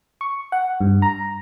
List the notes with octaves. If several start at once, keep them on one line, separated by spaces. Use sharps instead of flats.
C#6
F#5
G2
A#5